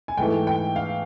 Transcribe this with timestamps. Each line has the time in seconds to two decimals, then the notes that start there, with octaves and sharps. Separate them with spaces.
0.08 G#5
0.17 G#2 E3 A3 G5
0.47 G5
0.76 F5